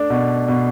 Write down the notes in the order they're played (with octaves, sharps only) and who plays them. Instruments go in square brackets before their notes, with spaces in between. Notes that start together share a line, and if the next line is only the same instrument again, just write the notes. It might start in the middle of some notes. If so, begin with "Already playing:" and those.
Already playing: [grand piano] A3 D4
B2
B2